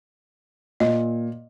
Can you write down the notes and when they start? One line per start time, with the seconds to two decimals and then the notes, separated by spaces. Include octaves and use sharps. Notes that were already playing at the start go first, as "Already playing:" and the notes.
0.80 A#2 D#5